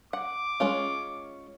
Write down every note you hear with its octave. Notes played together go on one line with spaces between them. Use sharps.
F#5 D6
G#3 C#4 F4